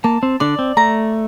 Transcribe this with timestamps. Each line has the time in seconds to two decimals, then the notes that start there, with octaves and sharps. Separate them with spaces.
0.04 A#3 A5
0.23 C4
0.40 D3 D4 D5
0.59 C4
0.77 A3 A#5